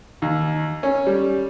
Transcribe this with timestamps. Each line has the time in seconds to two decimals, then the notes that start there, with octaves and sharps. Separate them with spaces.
0.22 D#2
0.83 C#4
1.07 G3